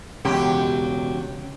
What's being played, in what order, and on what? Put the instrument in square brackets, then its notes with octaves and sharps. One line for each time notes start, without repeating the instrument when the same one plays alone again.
[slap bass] E1 [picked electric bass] C#3 [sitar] F#3 G4